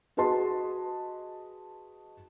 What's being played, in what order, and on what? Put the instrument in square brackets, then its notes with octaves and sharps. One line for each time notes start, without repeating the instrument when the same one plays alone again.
[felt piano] F#4 G#4 B4 D#5 A5 C6